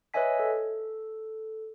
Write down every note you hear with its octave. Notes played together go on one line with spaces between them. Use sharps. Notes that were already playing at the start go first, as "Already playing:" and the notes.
B4 C#5 D#5 E5 G#5 B6
A4